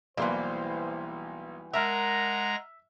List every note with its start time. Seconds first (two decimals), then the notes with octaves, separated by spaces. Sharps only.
0.17 B1 E3 G3 A#3 C5 C6
1.73 G#3 A#4 E5 F#5 A5 A#5 F6 A#6